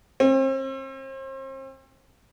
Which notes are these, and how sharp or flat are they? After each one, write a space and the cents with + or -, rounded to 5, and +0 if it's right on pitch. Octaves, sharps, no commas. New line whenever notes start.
C4 +40